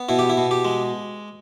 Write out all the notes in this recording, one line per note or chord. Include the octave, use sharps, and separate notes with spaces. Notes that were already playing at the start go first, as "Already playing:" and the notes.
Already playing: B3
B2 E4
G4
E4
B2
G4
G#3